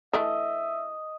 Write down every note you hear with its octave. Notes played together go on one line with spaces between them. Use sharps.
E3 A3 D4 D#5 E5